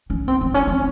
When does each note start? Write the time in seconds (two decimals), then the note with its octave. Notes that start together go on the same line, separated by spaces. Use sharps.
0.10 C#4
0.28 C4
0.41 C4
0.54 C#4
0.67 C4